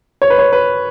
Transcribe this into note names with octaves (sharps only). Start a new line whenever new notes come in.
C#5
B4
C#5
B4